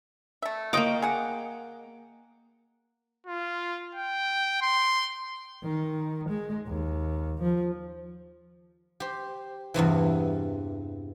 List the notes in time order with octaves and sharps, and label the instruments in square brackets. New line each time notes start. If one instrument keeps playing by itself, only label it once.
[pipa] A3 E5
[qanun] A#3 G5 D6 [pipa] F4 C#5 D#5
[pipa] G#4 F#5
[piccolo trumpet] F4
G5
C6
[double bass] D#3
G#3
D#2
F3
[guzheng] G4 C5
E2 G2 C3 E3